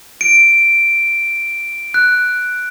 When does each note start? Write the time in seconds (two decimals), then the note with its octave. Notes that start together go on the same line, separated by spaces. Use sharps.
0.21 D7
1.94 F#6